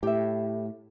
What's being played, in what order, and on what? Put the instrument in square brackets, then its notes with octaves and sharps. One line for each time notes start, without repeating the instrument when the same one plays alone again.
[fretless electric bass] A2 [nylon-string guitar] G4 E5